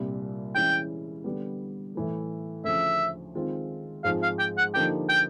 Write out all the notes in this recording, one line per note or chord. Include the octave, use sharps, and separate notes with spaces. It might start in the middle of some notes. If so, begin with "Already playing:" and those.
Already playing: C2 A#2 G3
E3 G#3 C#4 E4 G5
D3 G3 B3
A2 E3 A3
D2 C#3 F3 E5
D#3 G#3 C4 F4
G#2 F3 G#3 C4 F4 F5
F5
G5
F#5
D3 F3 A#3 D#4 G4 G5
G5